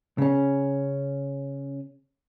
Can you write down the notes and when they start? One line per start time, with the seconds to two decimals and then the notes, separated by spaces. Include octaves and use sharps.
0.18 C#3 C#4